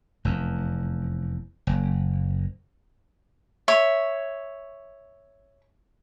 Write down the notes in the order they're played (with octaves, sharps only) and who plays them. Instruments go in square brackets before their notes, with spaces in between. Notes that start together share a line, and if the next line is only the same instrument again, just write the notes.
[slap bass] F1 E2
F#1
[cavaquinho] C#5 E5